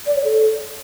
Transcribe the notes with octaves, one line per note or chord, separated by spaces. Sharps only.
D5
C#5
A4